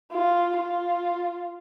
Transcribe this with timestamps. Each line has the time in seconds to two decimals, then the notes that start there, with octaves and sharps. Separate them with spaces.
0.13 F4
0.57 F4